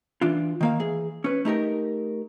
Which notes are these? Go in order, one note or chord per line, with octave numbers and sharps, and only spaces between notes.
E3 D4 F4
D#3 A#3 F5
E3 G#4
C#4 B4
A3 D#4 G4 A#4